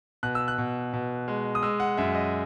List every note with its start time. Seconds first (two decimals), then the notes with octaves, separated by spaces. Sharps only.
0.23 B2 F#6
0.35 E6
0.48 F#6
0.58 B2
0.93 B2
1.28 G#3
1.55 D#6
1.63 G#3 E6
1.80 F#5
1.97 F#2 E5
2.15 D#5